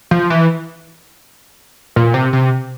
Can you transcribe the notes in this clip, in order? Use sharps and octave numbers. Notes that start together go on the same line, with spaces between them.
F3
E3
A#2
C3
C3